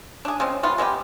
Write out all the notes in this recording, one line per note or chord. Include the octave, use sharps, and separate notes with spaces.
D4 G#4
C#3 G#3 C4
G3 B3 F4
G#3 B3 E4 G4